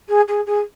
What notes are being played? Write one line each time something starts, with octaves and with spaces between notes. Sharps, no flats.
G#4
G#4
G#4